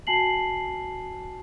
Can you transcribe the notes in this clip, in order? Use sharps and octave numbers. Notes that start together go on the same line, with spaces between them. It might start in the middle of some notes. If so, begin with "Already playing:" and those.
F#4 G#5 A5 C7 F#7